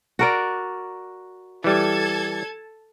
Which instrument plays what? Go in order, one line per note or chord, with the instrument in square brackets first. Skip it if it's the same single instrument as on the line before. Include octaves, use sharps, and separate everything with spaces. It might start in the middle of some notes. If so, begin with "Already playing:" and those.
[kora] F#4 A#4 D5
[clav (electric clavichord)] E3 G3 [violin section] A4 A5 G#6